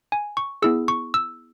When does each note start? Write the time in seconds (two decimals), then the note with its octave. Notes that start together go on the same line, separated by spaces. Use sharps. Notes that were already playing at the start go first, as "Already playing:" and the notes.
0.12 G#5
0.37 C#6
0.62 B3 E4 G#4 E6
0.88 C#6
1.14 E6